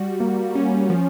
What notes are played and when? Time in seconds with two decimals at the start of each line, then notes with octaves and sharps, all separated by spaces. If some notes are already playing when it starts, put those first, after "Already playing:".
Already playing: G3 F#4
0.20 A#3
0.55 C#4
0.90 F3